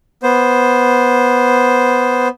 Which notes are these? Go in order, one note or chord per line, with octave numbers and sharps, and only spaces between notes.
B3 C5